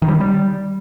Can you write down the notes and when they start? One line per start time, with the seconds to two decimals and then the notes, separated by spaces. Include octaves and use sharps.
0.02 D#3
0.08 G3
0.14 D#3
0.20 G3